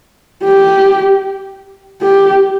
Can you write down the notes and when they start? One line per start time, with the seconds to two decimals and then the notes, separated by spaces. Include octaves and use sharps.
0.44 G4
2.02 G4